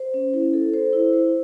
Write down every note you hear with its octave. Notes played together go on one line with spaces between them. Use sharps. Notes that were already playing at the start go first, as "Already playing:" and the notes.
Already playing: C5
C#4
E4
A4
C5
E4
C5